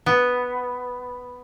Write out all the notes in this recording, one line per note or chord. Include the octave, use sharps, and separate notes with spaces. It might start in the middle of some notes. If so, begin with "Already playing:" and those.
B3